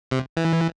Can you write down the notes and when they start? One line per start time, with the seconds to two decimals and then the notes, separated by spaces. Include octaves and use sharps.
0.11 C3
0.37 E3